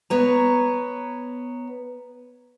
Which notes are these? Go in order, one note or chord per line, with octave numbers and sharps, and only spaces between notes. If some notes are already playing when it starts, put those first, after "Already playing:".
B3 C#5 A#5